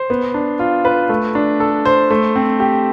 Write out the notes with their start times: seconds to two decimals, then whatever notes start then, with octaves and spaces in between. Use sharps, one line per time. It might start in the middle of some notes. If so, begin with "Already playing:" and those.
Already playing: C5
0.10 B3
0.34 D4
0.59 F4
0.85 B4
1.09 A3
1.35 D4
1.60 A4
1.85 C5
2.10 A3
2.36 C4
2.60 G4